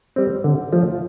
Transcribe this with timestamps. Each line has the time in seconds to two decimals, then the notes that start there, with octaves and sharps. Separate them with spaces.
0.16 G3 C4
0.44 D3
0.72 F3 A3